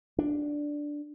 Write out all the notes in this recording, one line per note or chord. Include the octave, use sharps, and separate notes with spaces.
D4